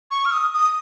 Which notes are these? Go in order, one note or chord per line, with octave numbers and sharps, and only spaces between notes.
C#6
F6
D#6
D#6